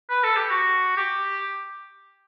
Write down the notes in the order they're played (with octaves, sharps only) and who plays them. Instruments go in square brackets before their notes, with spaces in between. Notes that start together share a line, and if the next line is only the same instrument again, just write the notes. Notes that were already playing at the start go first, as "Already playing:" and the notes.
[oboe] B4
A4
G4
F#4
G4